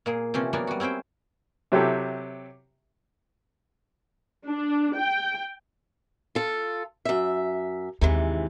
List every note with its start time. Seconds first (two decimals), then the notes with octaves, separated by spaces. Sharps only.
0.06 A#2 A#3 G#4
0.34 C3 E3 F3 C#4
0.53 E3 F#3 A#3 B3 D4
0.67 G3 F#4
0.80 C4 C#4 E4 C5 G5
1.72 C3 F#3 E4 G4 A4
4.48 D4
4.96 G5
6.35 F4 A4
7.05 F#2 E5
8.01 D#2 G#2 C3 E3